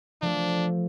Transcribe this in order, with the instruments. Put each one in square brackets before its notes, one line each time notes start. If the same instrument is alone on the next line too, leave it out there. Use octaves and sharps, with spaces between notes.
[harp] F3 A3 [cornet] D4